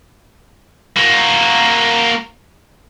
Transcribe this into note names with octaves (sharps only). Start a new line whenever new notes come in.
A#3 F#4